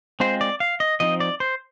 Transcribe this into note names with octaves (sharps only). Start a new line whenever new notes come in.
G#3 C4 F4 C5
D5
F5
D#5
F3 C4 D#4 D#5
D5
C5